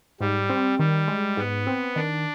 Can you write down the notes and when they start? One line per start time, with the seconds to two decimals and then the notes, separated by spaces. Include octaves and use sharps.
0.21 G#2 G3
0.50 C4
0.79 D#3 G3
1.08 G#3
1.37 G#2 B3
1.67 C4
1.96 D#3 D4